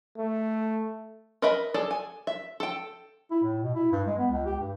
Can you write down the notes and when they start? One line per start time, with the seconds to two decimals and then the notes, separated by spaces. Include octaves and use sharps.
0.18 A3
1.42 A#4 B4 D#5 E5 B5
1.74 G#4 A4 D5
1.91 G#5
2.27 E5
2.60 A4 G5
3.31 E4
3.43 A2
3.63 B2
3.75 E4
3.92 G2
4.07 G#3
4.18 B3
4.31 C#2
4.46 G4
4.60 G2